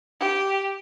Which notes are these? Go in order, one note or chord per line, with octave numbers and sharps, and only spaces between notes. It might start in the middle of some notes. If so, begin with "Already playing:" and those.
G4